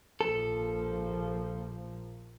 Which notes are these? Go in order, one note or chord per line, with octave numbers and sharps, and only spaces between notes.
A#1 F3 A#3 A4